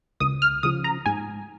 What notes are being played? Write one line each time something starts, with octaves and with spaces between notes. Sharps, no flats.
C#2 D#6
F6
C#3 F3 D#6
A#5
G#2 G#5